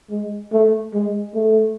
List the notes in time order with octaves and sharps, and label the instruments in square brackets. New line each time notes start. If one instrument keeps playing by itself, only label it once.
[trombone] G#3
A3
G#3
A3